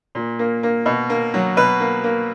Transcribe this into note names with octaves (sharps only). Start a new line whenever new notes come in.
A#2
A#3
A#3
B2
A#3
F#3
B2 B4
A#3
A#3